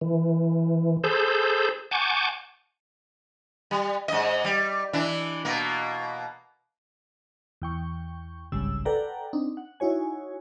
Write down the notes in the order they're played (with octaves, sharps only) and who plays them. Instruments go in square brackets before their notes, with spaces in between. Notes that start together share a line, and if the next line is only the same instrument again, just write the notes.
[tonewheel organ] E3
G#4 A4 C5 A5 B5 G6
F#5 G#5 A5 C#6 D6 G6
[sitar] G3
G#2 D#5
G3
E3 D4 E4
B2 A#3
[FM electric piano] E2 G5 C#6
G1 C2 G#2 C#3 G3 E6
A4 B4 D5 F#5 G5 A#5
C4 D4 D#4
F#5
D#4 E4 F#4 C#5 G#5